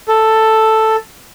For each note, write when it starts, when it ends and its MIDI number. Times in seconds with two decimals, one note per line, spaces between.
0.08 0.96 69